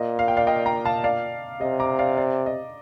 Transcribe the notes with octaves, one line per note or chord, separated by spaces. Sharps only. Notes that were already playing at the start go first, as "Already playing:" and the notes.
Already playing: A#2 D#5
F5
G5
D5 F5
D#5 G5
G5 A#5
F5 A5
D5 F5
C3 D#5
A#5 D6
D5 F5
D5
D#5